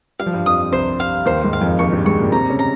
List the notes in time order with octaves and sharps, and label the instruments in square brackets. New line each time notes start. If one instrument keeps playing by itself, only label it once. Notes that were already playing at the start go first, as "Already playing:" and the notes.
[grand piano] G3 [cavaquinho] F5
[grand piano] F3
G2 G3
[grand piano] F2 F3 [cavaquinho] D#6
[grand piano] C2 C3 [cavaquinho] C5
[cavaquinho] F5
[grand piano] D#2 D#3 [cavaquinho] C5
[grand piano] G#2 G#3
[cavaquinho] F5
[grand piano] F2 F3
[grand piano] D#2 D#3 [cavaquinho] C#6
[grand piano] G2 G3
[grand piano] G#2 G#3 [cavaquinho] C#6
[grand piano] A#2 A#3
[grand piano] C3 C4 [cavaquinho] A#5
[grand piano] C#3 C#4
[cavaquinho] A#5